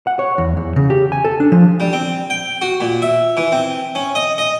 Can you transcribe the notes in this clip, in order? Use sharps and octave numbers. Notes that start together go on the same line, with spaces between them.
F#5
C#5
E2
E2
C#3
G4
G#5
A4
D4
F3
G3
C4
G5
F#4
A#2
E5
E3
C4
C#4
D#5
D#5